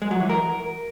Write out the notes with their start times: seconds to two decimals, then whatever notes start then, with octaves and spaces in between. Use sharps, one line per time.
0.02 G#3
0.11 F#3
0.20 E3
0.29 A#4